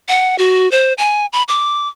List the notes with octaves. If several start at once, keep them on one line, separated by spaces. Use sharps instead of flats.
F#5
F#4
C5
G#5
B5
D6